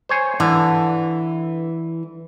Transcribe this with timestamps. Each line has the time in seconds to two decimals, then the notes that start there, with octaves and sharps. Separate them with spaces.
0.09 C5 C#5 G#5
0.40 D3 E3